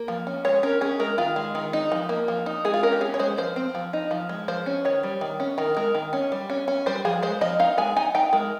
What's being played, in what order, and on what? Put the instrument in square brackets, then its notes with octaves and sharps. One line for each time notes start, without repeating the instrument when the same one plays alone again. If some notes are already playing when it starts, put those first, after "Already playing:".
Already playing: [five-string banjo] A#3
F3
C#4
G#3 C#5
C#4 A#4
C#4 G#4
G#3 A#4
D#3 F4
G#3
D#3
D#4
F3
A#3
F3
D#4
G#3 G#4
F4
C#4 A#4
G4
C#4 G#4
C#5
G#3 C5
F3 C5
C4
F3
D#4
F3
G#3
F3 C5
C#4
D#3 C#5
G3
D#3
C#4
D#3 A#4
G#3 A#4
D#3
C#4
G3
C#4
C#4
G3 C5
F3 G#4
G#3 C5
F3 D#5
D#4 F5
G#3 G#5
D#4 G#5
D#4 G5
G#3 A#4